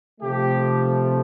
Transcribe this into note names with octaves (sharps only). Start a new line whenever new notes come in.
C3 F3 A3 G4